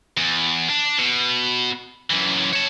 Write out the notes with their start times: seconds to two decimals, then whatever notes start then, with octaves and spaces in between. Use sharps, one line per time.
0.17 E2
0.69 D4
0.99 B2
2.11 F#2 E3
2.53 C#5 A5